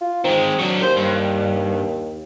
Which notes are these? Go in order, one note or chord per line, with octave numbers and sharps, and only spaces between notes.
F4
D#3 G#3 C4
F#3 D4
D#2 C5
G2